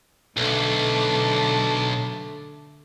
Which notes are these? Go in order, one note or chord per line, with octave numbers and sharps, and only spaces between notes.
B1 D3 A3 D4